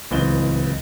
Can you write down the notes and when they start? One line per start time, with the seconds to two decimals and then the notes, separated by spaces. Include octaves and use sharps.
0.11 D1 C#2 E3 C4 D#5 G7